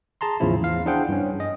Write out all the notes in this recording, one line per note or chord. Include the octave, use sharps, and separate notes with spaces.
G#4 A5 A#5 C6
E2 A2 C#3 F3 E4
E2 F5
D4 E4 G#4 C5 F#5 G5
G2 C#4
D#5